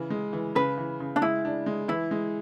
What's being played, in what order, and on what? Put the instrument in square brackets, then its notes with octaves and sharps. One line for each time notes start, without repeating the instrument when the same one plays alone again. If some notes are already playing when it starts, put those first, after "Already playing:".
Already playing: [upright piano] C#3 E3
G#3
E3
[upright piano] C#3 [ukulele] B4
[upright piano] E3
C#3
[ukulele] D4
[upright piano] G#3 [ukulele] E4
[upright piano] D4
G#3
[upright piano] E3 [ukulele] E4
[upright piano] G#3